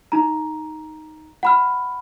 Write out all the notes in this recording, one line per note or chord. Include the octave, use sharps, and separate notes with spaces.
D#4 A#5
F#5 B5 F6